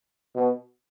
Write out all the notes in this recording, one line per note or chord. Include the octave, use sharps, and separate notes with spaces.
B2